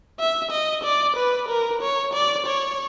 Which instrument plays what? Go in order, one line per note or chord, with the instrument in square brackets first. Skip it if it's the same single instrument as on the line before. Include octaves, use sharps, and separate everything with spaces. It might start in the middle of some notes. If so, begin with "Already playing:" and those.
[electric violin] E5
D#5
D5
B4
A#4
C#5
D5
C#5